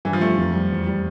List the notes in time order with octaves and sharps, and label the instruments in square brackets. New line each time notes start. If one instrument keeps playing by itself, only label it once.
[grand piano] G2 [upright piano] E3
[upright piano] F3
[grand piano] G3 [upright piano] A3
[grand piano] F2
G3
E2
G3